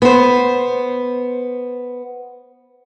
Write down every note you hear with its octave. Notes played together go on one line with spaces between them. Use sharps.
B3 C5